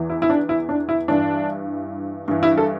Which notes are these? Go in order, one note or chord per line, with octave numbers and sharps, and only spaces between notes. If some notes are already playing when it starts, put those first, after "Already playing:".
Already playing: E2 E3
E4
E4
D4
E4
D4
E4
G2 E3 D4
G2 E3
E4
A4